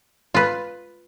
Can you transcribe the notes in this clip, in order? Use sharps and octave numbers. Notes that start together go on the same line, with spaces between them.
F4 B4